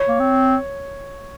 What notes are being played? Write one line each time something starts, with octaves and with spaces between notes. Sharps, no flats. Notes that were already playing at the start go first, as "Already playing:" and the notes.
Already playing: C#5
A#3
C4